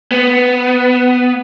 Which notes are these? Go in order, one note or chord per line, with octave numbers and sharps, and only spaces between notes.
B3